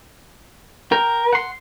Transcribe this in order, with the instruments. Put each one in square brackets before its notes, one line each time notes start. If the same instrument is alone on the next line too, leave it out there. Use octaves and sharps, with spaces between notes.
[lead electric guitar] A#4 [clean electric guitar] G5
[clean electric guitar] F#5 C6